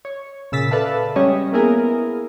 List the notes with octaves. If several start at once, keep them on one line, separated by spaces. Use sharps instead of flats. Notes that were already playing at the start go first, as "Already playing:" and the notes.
C#5
A#2 C#3 E6 A6 B6
A4 B4 D5 E5 F5 A5
G3 G#3 C#4 G4 C#5 D#5
A#3 B3 E4 G#4 A#4